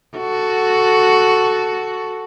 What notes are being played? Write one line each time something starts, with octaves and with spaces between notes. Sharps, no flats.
F#4 A4